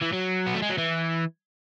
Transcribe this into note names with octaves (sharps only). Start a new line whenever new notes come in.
E3
F#3
B3
A3
G#3
F#3
E3